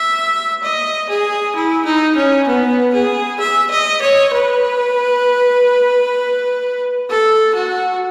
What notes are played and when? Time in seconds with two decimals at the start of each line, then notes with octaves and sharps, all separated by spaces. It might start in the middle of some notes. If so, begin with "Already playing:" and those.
Already playing: E5
0.63 D#5
1.09 G#4
1.56 E4
1.85 D#4
2.16 C#4
2.48 B3
2.94 G#4
3.40 E5
3.70 D#5
4.02 C#5
4.33 B4
7.10 A4
7.55 F#4